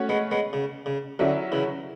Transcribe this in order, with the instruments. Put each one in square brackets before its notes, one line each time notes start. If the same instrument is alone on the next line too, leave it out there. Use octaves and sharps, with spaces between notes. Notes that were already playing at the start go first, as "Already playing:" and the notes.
Already playing: [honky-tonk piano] A3 C#4 F#4 C#5
[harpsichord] G#3 B3
G#3 B3
C#3
C#3
[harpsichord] D3 [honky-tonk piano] F#3 C#4 E4
[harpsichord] C#3 E3